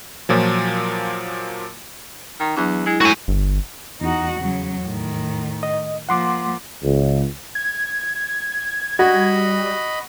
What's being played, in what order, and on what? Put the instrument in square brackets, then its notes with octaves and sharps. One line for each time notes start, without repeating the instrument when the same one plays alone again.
[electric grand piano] A#2 F3 F#3
[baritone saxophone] D#3
[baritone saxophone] E2 [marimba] F#3 D4
[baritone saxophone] G#3 [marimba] E4
[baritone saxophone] A2 [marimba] G#3 E4 [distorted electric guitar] F#4 G#5
[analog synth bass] G1
[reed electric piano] E2 [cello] D#4 F#4
[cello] C#3 F#3
A2 D#3
[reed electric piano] D#5
[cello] F3 A#3 [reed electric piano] F#5 C6 D6
[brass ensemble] C#2
[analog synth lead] G#6
[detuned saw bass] G3 [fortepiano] F#4 [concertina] D#5 B5